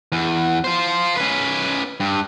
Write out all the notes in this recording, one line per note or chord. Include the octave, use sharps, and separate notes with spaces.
E2
F4 C5
C#4 B4
G2